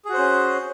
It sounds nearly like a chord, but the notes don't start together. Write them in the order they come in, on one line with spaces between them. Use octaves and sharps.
G#4 F#4 C5 C#4